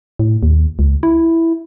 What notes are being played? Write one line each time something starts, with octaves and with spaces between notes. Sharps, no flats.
A2
D#2
C#2
E4